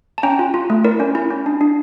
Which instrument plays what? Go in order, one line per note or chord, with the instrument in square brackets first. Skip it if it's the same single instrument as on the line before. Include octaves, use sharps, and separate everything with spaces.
[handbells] A5
C#4 G5 A#5
F4
F4
A3
E4 A#4 D5
C#4
E4
C#4
D4
D4